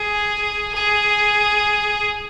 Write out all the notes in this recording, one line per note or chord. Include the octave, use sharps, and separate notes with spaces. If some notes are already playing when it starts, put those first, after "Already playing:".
Already playing: G#4
G#4